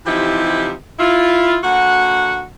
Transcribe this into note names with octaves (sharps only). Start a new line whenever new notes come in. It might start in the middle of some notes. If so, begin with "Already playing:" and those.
C3 E3 F3 D#4 E4 G4
E4 F4
D3 A#3 F#4 F#5